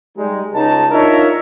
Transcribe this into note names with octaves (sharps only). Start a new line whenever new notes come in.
G3 G#3 D#4
C#2 D#4 A5
D4 D#4 F4 A#4 C#5 E5